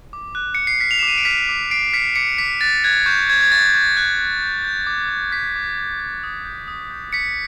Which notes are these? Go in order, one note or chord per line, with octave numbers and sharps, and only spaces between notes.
D6
F#6
F#6 C#7
C7
F6 B6
F7
D6 E7
D#7
D7
F6 B6 C#7
D6
D6 C7 D7
F6 B6 C#7
D6 B6 C#7
D6 B6
F#6 A6
F#6 G#6
C#6 G6
C#6 G#6
G#6
C#6 A6
C#6
F#6
F#6
G6
G6
D6
D6
G6 B6
D6
D6
G6
D#6
G6
D#6
G6
D#6 B6 C#7